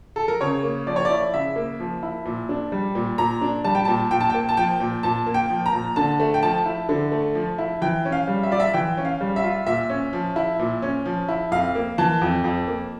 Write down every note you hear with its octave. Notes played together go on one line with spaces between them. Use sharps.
A4
A#4
C#3 C#5
A#3
F3 D5
C#5
D5
E4
C#3 E5
A#3
F3
E4
A#2
D4
G3
A#2
A#2 A#5
D4
G3 A5
G5
A#2 A5
A#2 G5
A5
A#3 G5
A5
F3 G5
A#2
A#2 A5
A#3
G5
F3
A#5
A#2
D3 A5
A3
G5
F3 A5
E4
D3
A3
F3
E4
E3 G5
C#4
F5
G3
E5
F4 D5
E5
E3 G5
C#4
F5
G3
E5
F4
A#2 E5
C#4
F3
E4
A#2
C#4
F3
E4
F2 F5
A#3
E3 A5
F2
F2
A#3